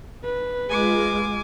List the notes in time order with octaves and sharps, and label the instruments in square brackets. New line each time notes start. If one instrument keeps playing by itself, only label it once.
[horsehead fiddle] B4
[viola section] G#3 F4 [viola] G#5 D6